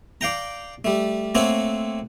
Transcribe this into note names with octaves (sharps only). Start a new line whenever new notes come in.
D5 F5 G5 A#5
G3 A3
A3 A#3 C4 A4 C#5 F#5